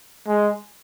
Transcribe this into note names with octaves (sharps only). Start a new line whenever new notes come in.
G#3